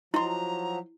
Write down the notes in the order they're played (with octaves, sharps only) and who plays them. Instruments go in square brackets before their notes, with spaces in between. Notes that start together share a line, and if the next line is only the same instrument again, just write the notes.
[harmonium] F3 F#3 [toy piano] E4 [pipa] D#5 C6 [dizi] A#5